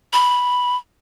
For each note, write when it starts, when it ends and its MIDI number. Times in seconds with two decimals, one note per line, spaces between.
0.13 0.76 83